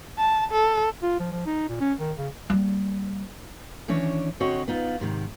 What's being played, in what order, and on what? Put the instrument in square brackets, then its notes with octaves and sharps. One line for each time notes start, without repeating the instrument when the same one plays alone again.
[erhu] A5
A4
[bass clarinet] F4
F3
F3
D#4
A#2
C#4
D#3
C#3
[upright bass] G3 A#3
[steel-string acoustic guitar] D#3 E3 C#4 D4 C#5
D3 C4 F#4 C#5 D#5 F#5
B3 D#4 F4
G#2 C3 D#3